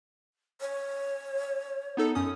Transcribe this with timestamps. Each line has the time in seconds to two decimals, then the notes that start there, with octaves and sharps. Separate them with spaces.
0.61 C#5
1.97 B3 D#4 A4
2.15 F#2 C#4 D#6